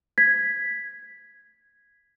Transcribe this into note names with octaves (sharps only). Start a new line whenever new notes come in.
G#6 B6